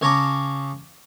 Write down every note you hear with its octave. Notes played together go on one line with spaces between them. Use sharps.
C#3 C#5 A5 A#5 C#6 D6